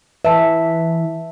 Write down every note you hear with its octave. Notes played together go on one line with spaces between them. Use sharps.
E3 B4 E5 A5